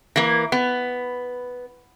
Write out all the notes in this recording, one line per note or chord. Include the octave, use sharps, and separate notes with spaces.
E3 A#3
B3